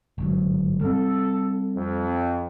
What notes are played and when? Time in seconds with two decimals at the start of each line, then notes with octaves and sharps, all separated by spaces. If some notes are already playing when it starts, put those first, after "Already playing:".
0.18 G1 G#2 F#3
0.81 G3 C4 A4
1.76 F2